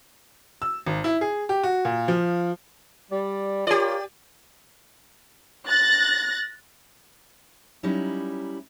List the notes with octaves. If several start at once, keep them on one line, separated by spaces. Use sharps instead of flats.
E6
G#1
E4
G#4
G4
F#4
A#2
F3
G3 D5
F4 G4 A#4 C#5 D5
F#6 A6 A#6
F#3 G3 C#4 D#4 E4